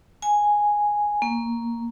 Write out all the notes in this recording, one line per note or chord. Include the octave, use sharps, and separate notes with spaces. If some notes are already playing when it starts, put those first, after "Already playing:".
G#5
A#3